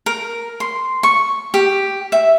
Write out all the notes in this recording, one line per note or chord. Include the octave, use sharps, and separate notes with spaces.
A#4
C6
C#6
G4
E5